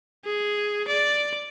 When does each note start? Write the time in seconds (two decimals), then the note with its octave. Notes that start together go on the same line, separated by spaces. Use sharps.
0.25 G#4
0.88 D5